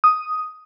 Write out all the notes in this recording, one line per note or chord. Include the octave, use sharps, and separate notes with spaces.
D#6